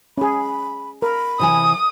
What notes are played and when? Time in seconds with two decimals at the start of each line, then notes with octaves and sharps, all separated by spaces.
0.18 C#4 G#4 B5
1.02 A#4 B5
1.39 C3 E3 G#5 D#6